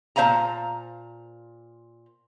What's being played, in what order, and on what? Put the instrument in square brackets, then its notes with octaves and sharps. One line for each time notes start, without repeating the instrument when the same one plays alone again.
[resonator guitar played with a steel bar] A#2 D4 C5 F5 A5 A#5